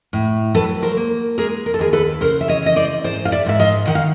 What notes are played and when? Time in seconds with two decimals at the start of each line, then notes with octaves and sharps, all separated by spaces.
0.13 A2
0.55 F#3 A4 B4
0.82 A#4 C5
0.97 A#3
1.38 G#3 G#4 A#4
1.66 A#4
1.74 A4
1.79 D#2 G#4 A#4
1.93 A4 B4
2.21 C#3 A#4 C5
2.41 E5
2.48 C#5 D#5
2.62 E3 D#5
2.76 C5 D5
3.04 G#2 C5 D5
3.25 F5
3.32 D5 E5
3.46 G#2 E5
3.59 D#5 F5
3.87 D#3 F#5
3.95 F5